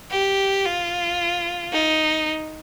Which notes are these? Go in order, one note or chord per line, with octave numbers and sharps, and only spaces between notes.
G4
F4
D#4